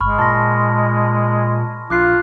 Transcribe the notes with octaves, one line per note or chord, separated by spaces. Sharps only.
G1 G#3 B5 C#6 F6
A#2 A5 C6 A#6
A#1 F4 D6 F#6 C7